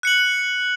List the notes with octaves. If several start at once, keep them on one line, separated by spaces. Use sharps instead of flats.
F#6 C#7 F#7